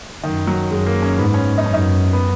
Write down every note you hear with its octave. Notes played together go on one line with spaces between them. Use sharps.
F#2 D#3
F#3
F#2 G#3
A#3
C#4
G#2 B3
C#4
D#4
F#2 C#4
D#4
B3